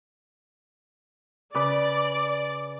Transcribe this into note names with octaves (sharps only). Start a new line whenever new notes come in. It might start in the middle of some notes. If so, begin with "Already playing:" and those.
C#3 B4 D5 D6